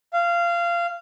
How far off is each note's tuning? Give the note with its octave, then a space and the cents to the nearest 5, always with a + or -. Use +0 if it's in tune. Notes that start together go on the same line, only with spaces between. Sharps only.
F5 -20